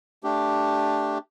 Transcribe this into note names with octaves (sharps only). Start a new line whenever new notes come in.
A3 D4 G4